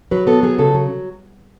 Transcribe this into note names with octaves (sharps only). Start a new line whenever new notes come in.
F#3 B4
B3 A4
F#3 G#4
C#3 A4
F#3